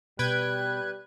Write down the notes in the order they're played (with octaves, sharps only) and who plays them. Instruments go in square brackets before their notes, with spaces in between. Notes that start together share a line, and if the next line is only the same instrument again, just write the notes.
[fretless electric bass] B2 [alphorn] G3 [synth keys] B4 G5 G#6 [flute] F#6